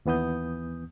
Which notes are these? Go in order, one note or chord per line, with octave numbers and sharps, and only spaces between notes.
D#2 E3 B3 D#6 G6